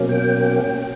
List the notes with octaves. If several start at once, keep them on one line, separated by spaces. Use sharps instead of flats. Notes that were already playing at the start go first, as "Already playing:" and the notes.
Already playing: B2 F#3 A#3 C#4
G5